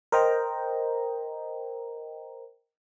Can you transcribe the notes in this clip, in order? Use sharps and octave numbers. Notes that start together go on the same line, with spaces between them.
A#4 C5 D#5 G5 A#5